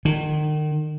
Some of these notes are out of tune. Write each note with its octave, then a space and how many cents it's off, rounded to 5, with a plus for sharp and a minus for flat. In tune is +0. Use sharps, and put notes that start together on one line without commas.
D#3 -35